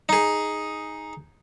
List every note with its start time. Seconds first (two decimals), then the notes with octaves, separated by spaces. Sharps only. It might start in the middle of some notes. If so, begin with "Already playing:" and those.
0.09 D#4 G#4